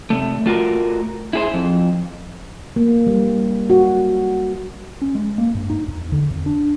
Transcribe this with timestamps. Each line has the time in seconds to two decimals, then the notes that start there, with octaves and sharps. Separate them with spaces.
0.10 C3 A3
0.46 A3 F4 F#4 A#4
1.33 E4 G#4 C5
1.54 F2
2.76 A#3
3.07 G3
3.70 F#4
5.02 C#4
5.15 G#3
5.38 A#3
5.55 G2
5.70 D#4
5.88 E2
6.12 D3
6.31 F2
6.46 D4